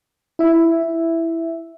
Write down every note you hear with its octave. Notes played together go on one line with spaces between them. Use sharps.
E4 E5